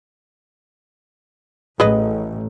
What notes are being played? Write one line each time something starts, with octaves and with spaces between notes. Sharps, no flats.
A1 G#4 B4 D#5